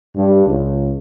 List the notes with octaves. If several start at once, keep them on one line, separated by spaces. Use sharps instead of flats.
G2
C#2